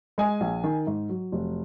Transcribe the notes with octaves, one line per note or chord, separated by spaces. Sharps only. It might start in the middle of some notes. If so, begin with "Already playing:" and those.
G#3 G#5
A#1
D#3
G#2
F#3
F1